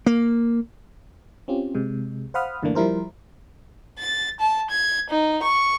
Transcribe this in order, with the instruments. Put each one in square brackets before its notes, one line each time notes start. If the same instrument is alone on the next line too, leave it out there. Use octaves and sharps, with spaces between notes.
[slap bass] A#3
[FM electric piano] C4 C#4 F4 G4
C3 G#3
C5 F5 F#5 B5 D#6 F6
F#2 D3 E3 A3 A#3 D4
F3 G3 E4 A#4 C5
[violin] A6
A5
G#6
D#4
C#6